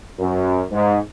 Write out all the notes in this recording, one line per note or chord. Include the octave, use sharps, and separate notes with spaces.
F#2
G#2